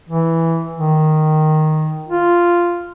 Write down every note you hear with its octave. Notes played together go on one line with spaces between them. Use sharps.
E3
D#3
F4